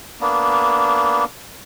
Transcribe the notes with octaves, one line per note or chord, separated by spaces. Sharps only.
A#3 B3 D4